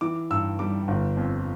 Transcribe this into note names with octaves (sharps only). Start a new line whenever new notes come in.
E3 D6
G2 E6
G3 D6
G1
F2